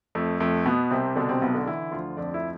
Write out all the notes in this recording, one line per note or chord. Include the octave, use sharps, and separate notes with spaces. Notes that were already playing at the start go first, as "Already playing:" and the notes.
F2 A3
F2 A3
B2 B3
C2 C3 C4
B2 D3 D4
C3 C4
B1 B2 B3
D3 D4
D3 E3 E4
D2 F3 F4
F2 D4 D5
E4 E5